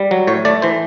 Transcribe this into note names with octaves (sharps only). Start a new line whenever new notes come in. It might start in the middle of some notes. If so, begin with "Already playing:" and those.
Already playing: G3
F#3
A2 C#5
A3 D5
E3 C5